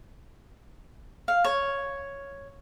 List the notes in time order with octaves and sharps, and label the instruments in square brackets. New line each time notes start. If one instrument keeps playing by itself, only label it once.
[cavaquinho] F5
C#5